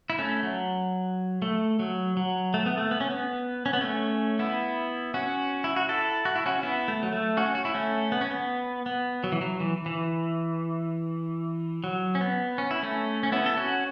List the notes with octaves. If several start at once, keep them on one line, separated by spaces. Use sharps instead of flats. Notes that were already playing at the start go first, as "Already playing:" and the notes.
E4
A3 C#4
F#3
A3
F#3
F#3
A3
B3
A3
B3
C#4
B3
C#4
B3
A3 C#4
B3 E4
C#4 F#4
E4
F#4
E4 A4
F#4
E4
C#4 F#4
B3 E4
A3
F#3
A3
C#4 F#4
F#4
E4
A3 C#4
B3
C#4
B3
B3
F#3
E3
F#3
E3
E3
F#3
C#4
B3
C#4
E4
A3 C#4
C#4
B3 E4
A4
C#4 F#4